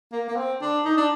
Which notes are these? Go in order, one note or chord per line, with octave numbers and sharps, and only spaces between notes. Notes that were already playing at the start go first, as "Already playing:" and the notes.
A#3
A#3
C4
D4
D#4
D4